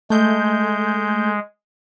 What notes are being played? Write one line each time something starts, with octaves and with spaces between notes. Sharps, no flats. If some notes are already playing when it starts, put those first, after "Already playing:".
G#3 A3 G6